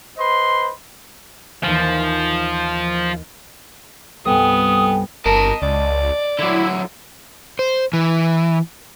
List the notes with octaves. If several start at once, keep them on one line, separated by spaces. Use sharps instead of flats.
B4 C5 D#5 B5 C6
D#2 E3 F3 G#5
C2 G2 B3 A4 G5 G#5 D#6
G1 A#4 D#5 A5
C#2 D5
D3 F#3 E4
C5
E3